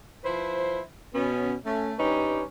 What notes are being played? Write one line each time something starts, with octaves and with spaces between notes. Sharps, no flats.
F3 E4 B4 C5
B2 B3 C#4
A3 C#4
G2 G3 C#4 D#4 G4 B4